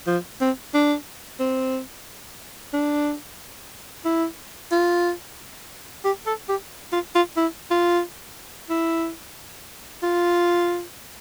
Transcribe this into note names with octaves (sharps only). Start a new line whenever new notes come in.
F3
C4
D4
C4
D4
E4
F4
G4
A4
G4
F4
F4
E4
F4
E4
F4